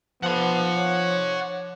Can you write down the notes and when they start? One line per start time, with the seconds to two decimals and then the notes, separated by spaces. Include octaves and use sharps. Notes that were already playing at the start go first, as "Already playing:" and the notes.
0.23 F3 B3 F#5 C6
0.77 C#5